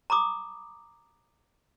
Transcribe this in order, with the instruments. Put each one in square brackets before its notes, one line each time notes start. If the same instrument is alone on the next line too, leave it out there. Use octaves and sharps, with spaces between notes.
[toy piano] A#5 B5 D6 D#6